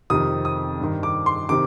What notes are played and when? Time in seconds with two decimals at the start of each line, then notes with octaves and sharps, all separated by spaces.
0.10 F2 C3 D#3 D#6
0.45 D#6
0.80 G2 D#3
1.03 D6
1.26 C6
1.49 C3 D#3 D6